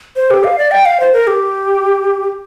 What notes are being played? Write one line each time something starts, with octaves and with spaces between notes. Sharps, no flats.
C5
G4
F5
D5
G5
F5
C5
A#4
G4